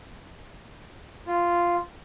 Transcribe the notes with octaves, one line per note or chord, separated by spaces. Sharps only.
F4